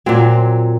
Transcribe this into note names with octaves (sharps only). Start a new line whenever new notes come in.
A#2 F#3 C4